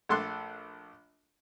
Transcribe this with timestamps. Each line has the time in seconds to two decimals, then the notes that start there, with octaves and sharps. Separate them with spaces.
0.09 A#1 A3 A4 C6 D6 F#6